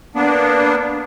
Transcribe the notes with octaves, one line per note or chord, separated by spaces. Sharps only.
A#3 B3 D4